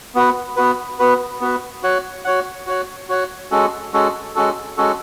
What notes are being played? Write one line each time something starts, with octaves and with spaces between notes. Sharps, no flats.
B3 F#4 B4
B3 F#4 B4
B3 F#4 B4
B3 F#4 B4
F#4 C#5 F#5
F#4 C#5 F#5
F#4 C#5 F#5
F#4 C#5 F#5
G#3 C#4 F#4 A4
G#3 C#4 F#4 A4
G#3 C#4 F#4 A4
G#3 C#4 F#4 A4